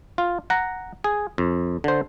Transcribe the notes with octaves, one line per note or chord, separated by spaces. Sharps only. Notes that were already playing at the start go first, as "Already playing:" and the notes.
F4
F#5 A#5
G#4
F2
D3 C5